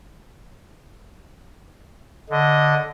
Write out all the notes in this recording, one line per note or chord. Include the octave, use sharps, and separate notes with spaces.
D3 D#5